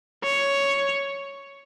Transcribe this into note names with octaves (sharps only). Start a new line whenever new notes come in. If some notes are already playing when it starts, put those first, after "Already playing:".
C#5